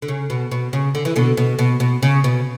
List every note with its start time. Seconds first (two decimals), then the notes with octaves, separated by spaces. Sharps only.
0.02 D3
0.08 C#3
0.30 B2
0.51 B2
0.73 C#3
0.95 D3
1.05 E3
1.16 B2 D3
1.37 B2
1.59 B2
1.80 B2
2.03 C#3
2.24 B2